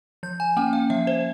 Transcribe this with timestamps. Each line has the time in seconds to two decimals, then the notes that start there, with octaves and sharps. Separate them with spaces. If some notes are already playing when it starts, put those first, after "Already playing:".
0.23 F3 G6
0.40 G#5
0.57 A#3 C#4 G5
0.73 F5
0.90 F3 E5
1.07 C5